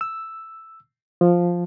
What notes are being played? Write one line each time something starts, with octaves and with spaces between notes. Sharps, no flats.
E6
F3